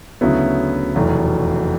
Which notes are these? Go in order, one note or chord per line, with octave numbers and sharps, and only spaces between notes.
D2 C#3 F#3 B3 E4
F1 E2 B2 F#3